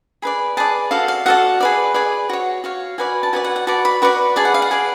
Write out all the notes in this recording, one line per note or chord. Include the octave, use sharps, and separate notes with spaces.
G#4 B4 D5 B5
G#4 B4 D5 A5
F#4 A4 D5 F5
F5
F#4 A4 D5 F#5
G#4 B4 D5
G#4 B4 D5
F#4 C#5
F#4 C#5 F5
F#4 B4 D5 G#5
A5
F#4 B4 D5 G#5
F#5
F#5
F#4 B4 D5 A5
B5
F#4 B4 D5 C#6
G#4 B4 D5 A5
F#5
F5
F#5
G#4 B4 D5